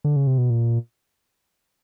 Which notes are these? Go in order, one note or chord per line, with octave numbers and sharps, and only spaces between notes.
D3
C#3
C3
B2
A#2